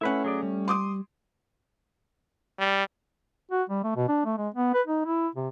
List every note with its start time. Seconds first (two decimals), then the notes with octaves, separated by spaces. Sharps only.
0.01 A3 C#4 E4 B4 F#5
0.24 F#3 G#4 D5
0.43 G3
0.68 C6 D6 D#6
2.59 G3
3.52 F#4
3.70 G3
3.84 A3
3.96 B2
4.09 D4
4.25 A3
4.38 G#3
4.54 B3
4.74 B4
4.87 D#4
5.06 E4
5.35 C3